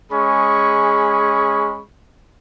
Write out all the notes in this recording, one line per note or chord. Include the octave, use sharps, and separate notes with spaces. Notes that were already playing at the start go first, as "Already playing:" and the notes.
G#3 C#4 G#4 B5 C#6